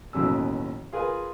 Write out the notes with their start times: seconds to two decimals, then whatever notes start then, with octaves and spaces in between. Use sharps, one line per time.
0.13 A1 D#2 B2 F#3 C#4 E6
0.92 F4 G#4 A#4 B4 G#5